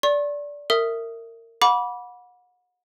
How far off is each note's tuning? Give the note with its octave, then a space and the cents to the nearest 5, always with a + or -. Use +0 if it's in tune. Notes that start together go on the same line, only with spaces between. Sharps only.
D5 -15 C#6 -40
A#4 -25 E5 +0 D#6 +0
F#5 -35 B5 -25 D6 -20